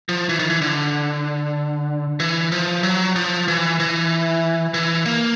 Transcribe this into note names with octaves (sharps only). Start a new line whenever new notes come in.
F3
E3
D#3
E3
D3
E3
F3
F#3
F3
E3
E3
E3
A#3